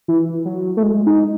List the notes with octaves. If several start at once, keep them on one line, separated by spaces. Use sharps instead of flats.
E3
F#3
A3
G#3
D#4